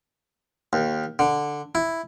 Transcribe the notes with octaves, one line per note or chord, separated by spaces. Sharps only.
D#2
D3
E4